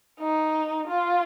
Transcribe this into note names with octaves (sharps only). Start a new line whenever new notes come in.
D#4
F4